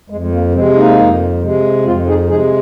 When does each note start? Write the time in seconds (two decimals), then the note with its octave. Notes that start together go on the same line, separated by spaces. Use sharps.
0.10 F2 G#3
0.33 A#3
0.54 C3 G#3 C4
0.76 A#3 D#4
0.98 F2
1.42 C3 G#3
1.85 F2 C4 F4
2.07 D#4 G#4
2.28 C3 G#3 D#4 G#4